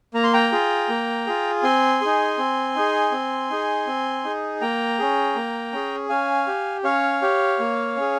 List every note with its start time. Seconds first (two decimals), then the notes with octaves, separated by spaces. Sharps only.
0.14 A#3 A#5
0.23 C6
0.33 G5 A#5
0.52 F4 G#4
0.89 A#3
1.27 F4 G#4
1.63 C4 G#5 C6
2.01 D#4 G#4
2.38 C4
2.76 D#4 G#4
3.12 C4
3.50 D#4 G#4
3.87 C4
4.24 D#4 G#4
4.61 A#3 G5 A#5
4.99 C#4 G#4
5.36 A#3
5.73 C#4 G#4
6.09 C#4 F5 G#5
6.47 G4
6.84 C#4 C#5 F5
7.22 G4
7.59 A#3
7.96 C#4 G#4